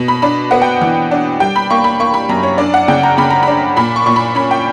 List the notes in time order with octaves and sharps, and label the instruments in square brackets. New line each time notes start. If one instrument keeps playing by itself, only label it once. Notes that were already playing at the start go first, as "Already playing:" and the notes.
Already playing: [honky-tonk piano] B2
B5
D4 B5
B3 F#5
G5
E3
D4
G3 G5
B5
A#3 C#6
B5
A#3 C#6
B5
F#2 A#5
C#5
D4 D5
F#5
C#3 G5
A#5
C#3 B5
A#5
D4 B5
A#2 B5
C#6
A#2 C#6
B5
C#4 B5
G5